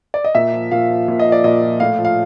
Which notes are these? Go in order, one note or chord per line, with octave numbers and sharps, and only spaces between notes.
D5
D#5
A#2 E5
F3
A#2 F5
F3
A#2
D#5
F3
D5
A#2 D#5
F3
A2 F5
F3
F5